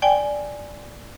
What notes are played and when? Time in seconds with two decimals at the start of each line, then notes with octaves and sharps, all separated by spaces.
0.02 D5 G5 G#5